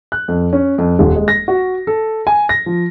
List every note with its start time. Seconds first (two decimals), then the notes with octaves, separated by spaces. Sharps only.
0.12 F#6
0.28 F2
0.53 C#4
0.78 F2
0.99 D#1
1.16 G#3
1.28 A#6
1.48 F#4
1.87 A4
2.27 G#5
2.49 A#6
2.66 F3